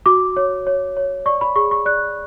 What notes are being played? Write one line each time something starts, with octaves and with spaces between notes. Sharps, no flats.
F#4 D6
C#5
C#5
C#5
D5 C#6
B5
G#4 C#6
C#6
D5 F#6